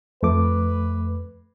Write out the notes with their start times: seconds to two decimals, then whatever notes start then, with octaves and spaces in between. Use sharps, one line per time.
0.23 F2 A3 B4 D6